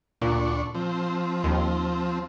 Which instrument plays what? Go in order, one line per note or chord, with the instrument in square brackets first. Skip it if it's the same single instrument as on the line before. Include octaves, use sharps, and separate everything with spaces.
[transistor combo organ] D2 D4 C#6 [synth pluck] A#2
[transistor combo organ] F3 C4
[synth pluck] D#2